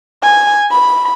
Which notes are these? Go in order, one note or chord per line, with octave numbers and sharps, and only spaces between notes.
G#5
B5